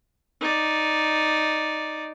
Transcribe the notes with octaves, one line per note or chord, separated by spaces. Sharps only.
D#4 D5